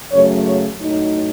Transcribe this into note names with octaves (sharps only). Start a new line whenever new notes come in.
F#2 C#3 F#3 A3 C#5
C#5
A2 F#3 A3 D#4